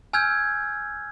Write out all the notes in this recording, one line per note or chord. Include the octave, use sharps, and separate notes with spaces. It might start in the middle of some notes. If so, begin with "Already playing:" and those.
G#5 E6 F6 G6 G#6